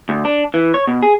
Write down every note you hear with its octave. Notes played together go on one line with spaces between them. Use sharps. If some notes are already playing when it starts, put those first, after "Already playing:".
D2
D4
E3
C#5
B2
G#4